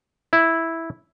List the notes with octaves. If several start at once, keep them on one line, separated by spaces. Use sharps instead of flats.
E4